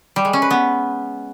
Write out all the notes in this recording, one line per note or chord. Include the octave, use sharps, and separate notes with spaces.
G3
G#3
C#4
B4
B3